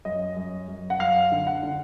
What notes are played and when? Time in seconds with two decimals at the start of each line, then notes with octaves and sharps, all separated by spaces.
0.05 F#2 D#5
0.36 F#2
0.68 F#2
0.90 F#5
1.00 F#2 F5
1.32 D3
1.47 F#5
1.63 D3